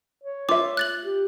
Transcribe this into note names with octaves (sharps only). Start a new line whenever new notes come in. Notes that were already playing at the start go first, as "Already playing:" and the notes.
C#5
F4 E5 D6
F#6 A6 F#7
G4